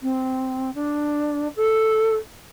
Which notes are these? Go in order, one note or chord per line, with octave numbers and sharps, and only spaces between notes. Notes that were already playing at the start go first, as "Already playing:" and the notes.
C4
D4
A4